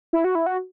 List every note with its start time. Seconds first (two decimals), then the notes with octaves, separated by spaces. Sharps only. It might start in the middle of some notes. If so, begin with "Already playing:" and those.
0.13 E4
0.24 F#4
0.35 E4
0.46 F#4